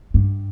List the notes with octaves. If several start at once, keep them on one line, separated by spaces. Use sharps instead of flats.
G2